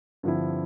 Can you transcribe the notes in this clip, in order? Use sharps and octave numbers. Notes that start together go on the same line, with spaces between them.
G2 D3 F3 C4 E4